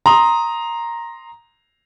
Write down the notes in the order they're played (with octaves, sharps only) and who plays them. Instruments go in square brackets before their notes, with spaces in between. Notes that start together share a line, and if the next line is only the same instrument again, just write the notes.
[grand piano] A#5 C6 D#6